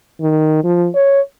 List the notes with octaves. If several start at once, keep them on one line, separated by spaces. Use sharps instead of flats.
D#3
F3
C#5